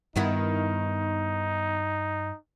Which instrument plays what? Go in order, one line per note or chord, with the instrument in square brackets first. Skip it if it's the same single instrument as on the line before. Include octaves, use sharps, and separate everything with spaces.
[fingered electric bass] G2 [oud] D#3 B3 E4 [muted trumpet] D#4